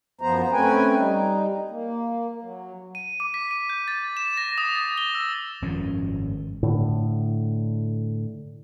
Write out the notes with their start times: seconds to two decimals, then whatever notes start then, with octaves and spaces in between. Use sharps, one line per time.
0.21 F#2 F3 B3 C5 A#5
0.52 A3 C4 C#4 B4 G5 G#5
0.96 G3 D#4
1.70 A#3
2.42 F#3
2.95 D#7
3.20 D6
3.34 B6
3.51 D#7
3.70 G6
3.88 A6
4.17 E7
4.37 A#6
4.58 D#6
4.75 A6
4.98 G7
5.15 E6
5.62 G#1 F#2 F3 C#4
6.63 A2 D3